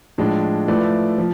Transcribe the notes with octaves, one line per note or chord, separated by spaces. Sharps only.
A2 F3 G#3 D4
F3 A3 E4 B4 D5
F3